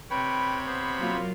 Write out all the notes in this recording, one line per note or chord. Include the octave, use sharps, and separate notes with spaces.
C3 B4 C#5 G5 B5
B3 C5
F#3 A#3 F4